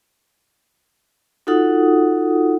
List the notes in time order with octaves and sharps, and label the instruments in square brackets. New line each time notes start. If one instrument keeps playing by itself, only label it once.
[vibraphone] D#4 F4 F#4 A4 F#5 D#6